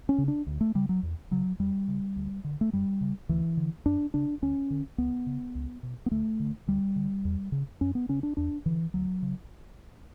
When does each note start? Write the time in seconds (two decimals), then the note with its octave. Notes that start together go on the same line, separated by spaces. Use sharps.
0.09 C#4
0.18 C#3
0.28 D4
0.47 D2
0.61 A3
0.75 C#3 G3
0.89 F#3
1.03 E2
1.31 C#3 F#3
1.59 E2 G3
1.88 C#3
2.16 D2
2.44 D3
2.61 A3
2.73 F#2 G3
3.01 C#3
3.29 D2 E3
3.57 D3
3.86 F#2 D4
4.14 C#3 D4
4.42 D2 C#4
4.70 D3
4.98 C#2 B3
5.26 C#3
5.55 C#2
5.83 B2
6.06 B3
6.11 D2 A3
6.40 D3
6.68 D2 G3
6.96 D3
7.25 E2
7.52 C#3
7.81 F#2 C#4
7.95 B3
8.09 C#3 C#4
8.23 D4
8.37 E2 D4
8.66 D3 E3
8.94 D2 F#3
9.22 C#3